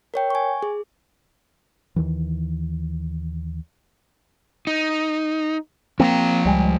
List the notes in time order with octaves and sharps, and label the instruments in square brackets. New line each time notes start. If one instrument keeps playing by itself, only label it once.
[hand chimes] A#4 C#5 G5
G#5 C#6
G#4
[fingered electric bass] D#2 C3 D#3 E3
[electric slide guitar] D#4
[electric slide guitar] F3 F5 A#5 [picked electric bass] A#3 C4
[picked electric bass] C#2 G3 G#3